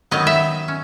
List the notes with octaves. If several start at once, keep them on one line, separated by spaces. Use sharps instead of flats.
D#3 F#3 B3 D#5
E5
C#4